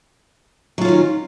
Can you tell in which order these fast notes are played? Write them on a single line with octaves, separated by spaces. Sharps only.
F#3 F4 C#4 D#3